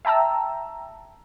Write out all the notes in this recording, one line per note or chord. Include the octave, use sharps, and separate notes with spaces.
E5 G5 A5 A#5 E6